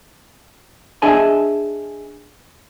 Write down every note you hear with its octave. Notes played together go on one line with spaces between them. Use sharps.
D4 G#4 D#5 E5 G#5 A5